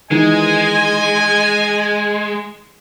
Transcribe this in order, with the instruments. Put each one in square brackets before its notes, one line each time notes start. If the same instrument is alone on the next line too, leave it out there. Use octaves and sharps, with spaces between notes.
[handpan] D#3 E3 D#4 [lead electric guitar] G#3 [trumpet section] D#5 G#5